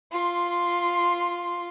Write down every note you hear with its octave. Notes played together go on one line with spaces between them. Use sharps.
F4 C6